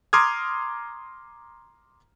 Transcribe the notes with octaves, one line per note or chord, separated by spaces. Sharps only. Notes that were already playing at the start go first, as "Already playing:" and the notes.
A#5 C6 D6 D#6 F6 G#6